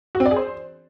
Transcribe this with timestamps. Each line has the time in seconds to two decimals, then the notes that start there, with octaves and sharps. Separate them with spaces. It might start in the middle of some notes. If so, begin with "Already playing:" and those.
0.15 F#4
0.20 C4
0.26 D5
0.31 G#4
0.36 C5